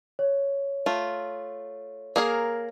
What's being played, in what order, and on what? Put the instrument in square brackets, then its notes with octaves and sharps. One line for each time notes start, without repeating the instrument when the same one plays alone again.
[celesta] C#5
[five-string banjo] A3 F4
A#3 G#4 A#4